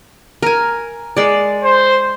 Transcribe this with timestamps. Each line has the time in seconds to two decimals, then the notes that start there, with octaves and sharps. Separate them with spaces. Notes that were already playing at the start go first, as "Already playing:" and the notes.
0.42 A#4 G#5
1.17 G#3 D5
1.64 C5